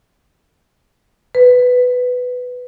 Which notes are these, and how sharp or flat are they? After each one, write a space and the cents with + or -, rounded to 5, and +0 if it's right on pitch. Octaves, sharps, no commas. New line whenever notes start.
B4 +10